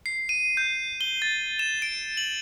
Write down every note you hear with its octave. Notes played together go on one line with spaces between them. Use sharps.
C7
D#7
G6
G7
A6
E7
D7
F#7